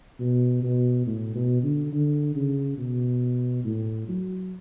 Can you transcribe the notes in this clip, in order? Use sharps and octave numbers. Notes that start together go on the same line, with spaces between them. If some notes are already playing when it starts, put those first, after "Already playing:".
B2
B2
A2
B2
D3
D3
C#3
B2
A2
F#3